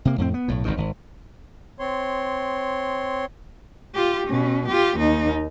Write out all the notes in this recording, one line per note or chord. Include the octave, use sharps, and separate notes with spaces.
C3 A#3
F2 A2 C4
B3
B1 A2
G1 F#2 D#3
G#1
C4 C#5 C6
F4 G4
B2 C#4
F4 G4
D#2 D#4